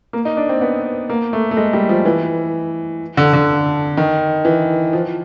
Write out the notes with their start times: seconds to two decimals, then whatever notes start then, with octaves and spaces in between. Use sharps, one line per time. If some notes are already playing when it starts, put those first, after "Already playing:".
0.13 A#3
0.25 D#4
0.37 D4
0.49 C4
0.61 B3
1.10 A#3
1.33 A3
1.51 A3
1.57 G#3
1.73 G3
1.89 F3
2.05 E3
3.17 D3
3.33 D3
3.97 D#3
4.45 E3
4.93 F3